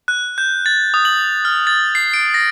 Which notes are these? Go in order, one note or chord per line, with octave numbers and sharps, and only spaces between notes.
F#6
G6
A6
D#6
F#7
F6
A6
C7
D7
A#6